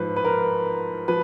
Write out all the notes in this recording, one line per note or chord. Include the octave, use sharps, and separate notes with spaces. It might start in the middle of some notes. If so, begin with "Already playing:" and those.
Already playing: G#2 F3 B4 C5
B4
A#4
F3 B4